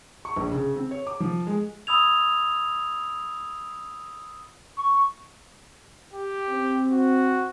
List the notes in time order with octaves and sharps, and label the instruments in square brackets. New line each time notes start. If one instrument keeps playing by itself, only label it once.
[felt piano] C#6
A#1
C#3
C4
C#5
D6
F3
G#3
[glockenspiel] B5 D#6 E6 G#6 F7
[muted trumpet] C#6
[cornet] G4
[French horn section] C4
[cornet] F#4